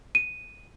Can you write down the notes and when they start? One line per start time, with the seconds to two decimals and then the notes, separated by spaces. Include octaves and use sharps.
0.15 D#7